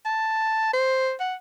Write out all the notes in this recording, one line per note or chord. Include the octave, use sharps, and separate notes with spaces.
A5
C5
F#5